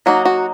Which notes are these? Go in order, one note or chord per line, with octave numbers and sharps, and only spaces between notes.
F#3 A#3 D#4 F#4
F#4